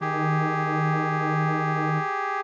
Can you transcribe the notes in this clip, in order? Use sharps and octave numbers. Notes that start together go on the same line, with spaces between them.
D#3 G4 G#4